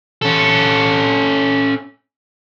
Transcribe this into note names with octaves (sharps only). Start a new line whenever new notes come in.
C#4 A4